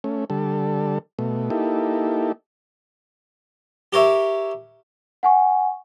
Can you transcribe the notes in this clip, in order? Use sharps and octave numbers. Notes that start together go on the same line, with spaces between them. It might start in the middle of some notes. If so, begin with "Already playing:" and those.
A3 C#4
D3 G3 A4
B2 A3
A#3 D#4 E4 G4 A4
G4 A#4 C#5 E5
F#5 G#5 C#6